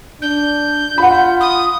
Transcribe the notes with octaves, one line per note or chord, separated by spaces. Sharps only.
D4 G6
F4 F#5 B5
D#6